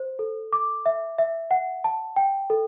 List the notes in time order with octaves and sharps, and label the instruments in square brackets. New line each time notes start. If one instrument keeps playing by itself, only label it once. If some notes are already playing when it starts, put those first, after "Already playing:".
Already playing: [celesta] C5
A4
D6
E5
E5
F#5
A5
G5
A4